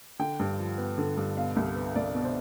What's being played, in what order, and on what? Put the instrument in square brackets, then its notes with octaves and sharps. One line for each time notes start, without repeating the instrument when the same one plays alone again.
[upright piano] D3 G5
G2
F3
B3
D3
G2
B2 F5
C2
B3
C2 D5
B2
C5